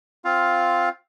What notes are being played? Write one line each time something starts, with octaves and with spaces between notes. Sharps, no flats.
C4 F4 F5